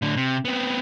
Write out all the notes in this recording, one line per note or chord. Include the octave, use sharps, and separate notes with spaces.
A2 D3
C3
B3 C4